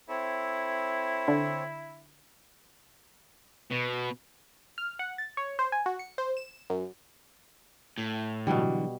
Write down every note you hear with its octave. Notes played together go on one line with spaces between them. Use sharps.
C4 E4 A4 C#5
D3
B2
F6
F#5
A6
C#5
C5
G#5
F#4
C#7
C5
E7
F#2
A2
B2 D3 E3 F#3 G3